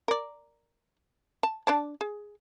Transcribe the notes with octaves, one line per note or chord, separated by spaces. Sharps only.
A#4 D5
A5
D4 D5 A5
G#4